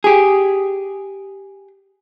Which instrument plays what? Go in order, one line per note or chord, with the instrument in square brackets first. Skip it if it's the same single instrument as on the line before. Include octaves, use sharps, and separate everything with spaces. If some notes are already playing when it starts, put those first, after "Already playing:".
[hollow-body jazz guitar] G4 G#4